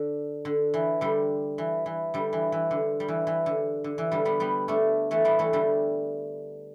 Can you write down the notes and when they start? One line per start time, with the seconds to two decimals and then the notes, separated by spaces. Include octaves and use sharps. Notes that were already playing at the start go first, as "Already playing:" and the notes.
Already playing: D3
0.45 D3
0.74 E3
1.01 D3 G3
1.58 E3
1.86 E3
2.14 D3 G3
2.33 E3
2.52 E3
2.71 D3
3.00 G3
3.08 E3
3.27 E3
3.46 D3
3.84 D3
3.98 E3
4.12 D3 G3
4.25 G3 B3
4.40 G3 B3
4.68 A3 D4
5.11 E3 A3
5.25 G3 B3
5.39 E3 A3
5.53 D3 G3